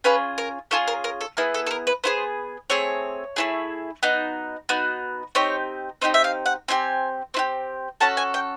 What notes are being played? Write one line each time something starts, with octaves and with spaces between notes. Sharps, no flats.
C#4 F4 G#4 B4
A#4
C#4 F4 G#4 A4
A#4
A#4
A4
B3 E4 G#4 A#4
A4
A4
A#4
B4
B3 E4 G#4 C5
A3 C4 G#4 C#5
A3 C4 E4 G#4
B3 D#4 F#4
B3 D#4 F#4
C4 D#4 G4 C#5
C4 D#4 G4 D#5
E5
F5
F#5
C4 E4 G4 G#5
C4 E4 G4
C#4 F#4 A4 A5
G#5
G5